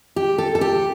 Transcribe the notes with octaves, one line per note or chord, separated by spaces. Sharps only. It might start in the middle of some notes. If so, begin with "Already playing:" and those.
G4
A4
A4
G4